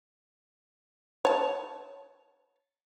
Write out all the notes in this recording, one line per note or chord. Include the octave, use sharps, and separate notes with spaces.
C#5 A5